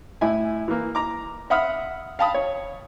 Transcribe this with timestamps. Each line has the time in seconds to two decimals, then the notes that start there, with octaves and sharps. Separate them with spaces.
0.21 A2 E4 G#5
0.68 E3 A#3
0.95 A#5 D6
1.50 E5 F#5 B5 D#6 F6
2.19 F5 G5 A5 B5 D#6
2.34 C#5